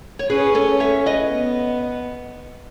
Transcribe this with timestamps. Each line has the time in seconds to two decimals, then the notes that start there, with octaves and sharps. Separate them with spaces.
0.19 C#5
0.30 C#4 G#4 B4
0.55 A4 C#5
0.80 C#5 E5
1.06 B4 D#5
1.31 B3